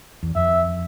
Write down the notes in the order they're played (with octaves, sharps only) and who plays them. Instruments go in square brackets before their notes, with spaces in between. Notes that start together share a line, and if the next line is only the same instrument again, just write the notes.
[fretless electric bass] E2
[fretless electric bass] F2 [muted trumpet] E5